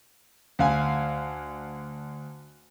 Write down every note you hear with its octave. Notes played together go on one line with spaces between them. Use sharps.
D2 F5 G#5